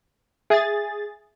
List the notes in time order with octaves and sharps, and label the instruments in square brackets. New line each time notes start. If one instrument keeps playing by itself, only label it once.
[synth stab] G#4 A6 [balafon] E5